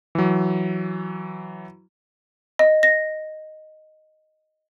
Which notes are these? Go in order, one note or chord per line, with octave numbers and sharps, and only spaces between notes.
E3 F#3
D#5
A#6